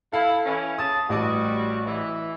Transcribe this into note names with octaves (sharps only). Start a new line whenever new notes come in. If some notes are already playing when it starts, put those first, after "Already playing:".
E4 A4 F5
E3 C#4
C#3 A5 D#6
A1 G3 F#4 D6 D#6
E3